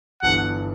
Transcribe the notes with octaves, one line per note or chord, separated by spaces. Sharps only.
G1 G2 E3 G3 B3 F#5